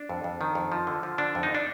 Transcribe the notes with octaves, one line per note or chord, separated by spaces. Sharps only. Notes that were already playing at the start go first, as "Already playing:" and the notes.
Already playing: D4
F2
F2
D#3
F2
F3
D3
F3
D3 D4
F2
D#4
D4